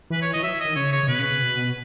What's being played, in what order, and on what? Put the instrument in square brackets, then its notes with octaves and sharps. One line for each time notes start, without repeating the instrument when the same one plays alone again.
[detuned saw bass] E3 [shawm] B4
[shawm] C#5
[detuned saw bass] E3 [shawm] D#5
[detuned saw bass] F#3 [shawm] E5
[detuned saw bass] D#3 [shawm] D#5
[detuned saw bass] C#3 [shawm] C#5
[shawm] C#5
[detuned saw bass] C#3
[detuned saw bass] B2 [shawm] B4
[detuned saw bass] C#3
C#3
B2